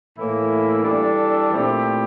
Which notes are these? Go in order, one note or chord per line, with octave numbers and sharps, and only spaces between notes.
A2 E3 A#3 E4
E3 G3 D4 A4
A#2 A3 C4 E4 G4